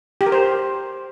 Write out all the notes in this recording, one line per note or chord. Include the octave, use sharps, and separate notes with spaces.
G4
A#4
C5